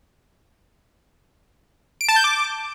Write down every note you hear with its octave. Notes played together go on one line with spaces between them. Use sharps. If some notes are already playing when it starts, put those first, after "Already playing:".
D7
A5
G6
D6